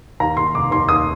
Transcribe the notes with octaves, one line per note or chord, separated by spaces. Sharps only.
D#2 A#5
D#2 C6
F1 D6
D#2 C6
D#2 D#6